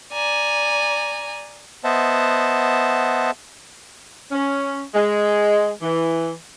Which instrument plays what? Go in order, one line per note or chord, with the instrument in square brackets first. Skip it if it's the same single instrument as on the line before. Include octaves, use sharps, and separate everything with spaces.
[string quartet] D5 G#5 A#5
[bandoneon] B3 C5 D#5 E5 F#5 A5
[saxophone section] C#4
G#3
E3